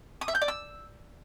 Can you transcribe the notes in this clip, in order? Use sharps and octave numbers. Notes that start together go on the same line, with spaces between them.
D#6
E5
G6
D5
E6